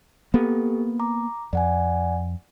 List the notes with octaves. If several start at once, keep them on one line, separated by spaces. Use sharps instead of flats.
A#3 B3 G4 A4
A#5 D6
F2 D5 F#5 G#5